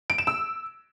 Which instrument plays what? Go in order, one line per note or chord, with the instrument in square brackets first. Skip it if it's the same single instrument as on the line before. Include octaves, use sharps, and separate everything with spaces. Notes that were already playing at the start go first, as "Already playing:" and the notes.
[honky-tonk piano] D7
E7
E6